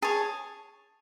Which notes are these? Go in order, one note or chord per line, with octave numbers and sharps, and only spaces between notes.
G#4 C#5 A5